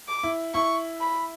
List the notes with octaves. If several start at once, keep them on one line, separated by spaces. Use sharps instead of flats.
D6
E4
E4 C#6
B5